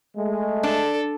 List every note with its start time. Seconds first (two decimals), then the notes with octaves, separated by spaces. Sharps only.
0.16 G#3 A3
0.63 D4 A4